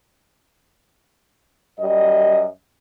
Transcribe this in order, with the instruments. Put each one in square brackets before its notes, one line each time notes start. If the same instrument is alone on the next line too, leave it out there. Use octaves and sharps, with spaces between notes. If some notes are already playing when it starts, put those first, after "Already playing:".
[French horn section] F#2 G3 D#5